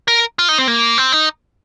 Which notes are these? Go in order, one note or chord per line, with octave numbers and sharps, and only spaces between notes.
A#4
F4
D#4
C4
A#3
C4
D#4